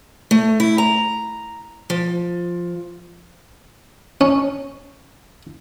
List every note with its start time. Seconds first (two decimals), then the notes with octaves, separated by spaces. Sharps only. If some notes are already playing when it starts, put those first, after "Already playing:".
0.31 A3
0.60 E4
0.78 A#5
1.90 F3
4.21 C#4